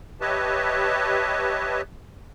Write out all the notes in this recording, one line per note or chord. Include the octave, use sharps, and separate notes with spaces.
G4 B4 C#5 D#5 E5 A5